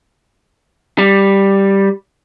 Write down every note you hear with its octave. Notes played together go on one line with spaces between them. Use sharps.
G3